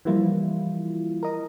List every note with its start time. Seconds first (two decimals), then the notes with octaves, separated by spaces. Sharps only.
0.05 E3 F3 G3 A#3 E4 F4
1.23 A#4 D#5